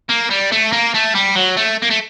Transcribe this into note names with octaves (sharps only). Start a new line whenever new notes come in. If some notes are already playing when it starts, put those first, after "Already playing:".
A#3
G3
A3
A#3
A3
G3
F#3
A3
A#3
A3